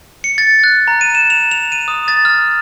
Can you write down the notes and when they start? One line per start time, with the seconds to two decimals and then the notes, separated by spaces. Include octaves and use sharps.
0.24 C#7
0.38 A6
0.64 F#6
0.88 A#5
1.01 D#7
1.15 E7
1.30 F7
1.51 F7
1.72 D#7
1.88 D#6
2.08 A6
2.25 F6